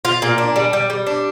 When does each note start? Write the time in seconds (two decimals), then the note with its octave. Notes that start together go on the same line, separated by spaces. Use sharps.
0.05 F4
0.22 A#2
0.38 D4
0.56 G3
0.73 G3
0.90 G3
1.07 D4